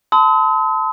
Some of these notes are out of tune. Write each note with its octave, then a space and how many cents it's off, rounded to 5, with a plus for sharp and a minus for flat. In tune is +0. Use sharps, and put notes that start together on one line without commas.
A5 +0 C6 -40 D#6 +45